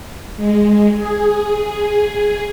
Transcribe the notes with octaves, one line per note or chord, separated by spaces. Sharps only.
G#3
G#4